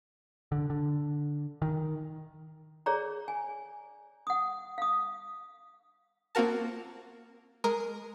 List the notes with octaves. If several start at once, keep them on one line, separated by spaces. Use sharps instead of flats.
D3
D3
D#3
G#4 C#5 D5 A#5
G#5
F#5 D#6
F5 D#6
A#3 C4 F4 F#4 A#4 A5
G#3 A#4 A#5 D#6